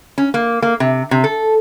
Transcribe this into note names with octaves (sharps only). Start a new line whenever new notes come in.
C#4
A#3
A#3
C3
C3
A4